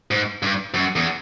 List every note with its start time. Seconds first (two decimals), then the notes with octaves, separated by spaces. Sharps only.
0.11 G#2
0.43 G2
0.74 F#2
0.96 E2